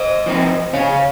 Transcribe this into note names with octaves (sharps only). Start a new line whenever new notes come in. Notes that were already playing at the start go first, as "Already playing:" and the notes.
Already playing: C5 D#5
F3 C4 D#4
C#3 C#5 F5